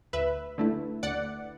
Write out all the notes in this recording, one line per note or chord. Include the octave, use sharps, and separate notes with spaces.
D2 B4 E5
D3 A3 E4
D2 D5 F#5